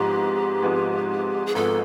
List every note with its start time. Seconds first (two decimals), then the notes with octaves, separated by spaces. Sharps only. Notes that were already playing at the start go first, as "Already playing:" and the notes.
Already playing: G#1 G#2 F3 G#3 B3 G4
0.62 G#1 G#2 F3 G#3 B3
1.46 G#4
1.55 G#1 G#2 F3 G#3 B3 A4